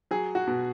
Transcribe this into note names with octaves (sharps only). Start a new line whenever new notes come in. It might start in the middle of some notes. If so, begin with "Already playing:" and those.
F#3 G#4
F#4
B2